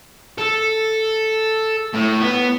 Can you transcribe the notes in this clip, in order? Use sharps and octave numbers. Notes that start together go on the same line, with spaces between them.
A4
A2
B3